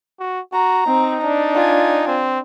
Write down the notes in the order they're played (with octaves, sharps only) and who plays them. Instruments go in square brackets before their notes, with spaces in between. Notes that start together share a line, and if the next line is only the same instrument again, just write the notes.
[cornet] F#4
[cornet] F#4 [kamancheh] A#5
[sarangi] C4 [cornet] D#4
[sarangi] D4
[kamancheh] F4 G#5
[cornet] C4